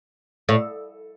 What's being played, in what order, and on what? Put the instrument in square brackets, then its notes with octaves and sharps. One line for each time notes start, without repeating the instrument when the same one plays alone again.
[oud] A2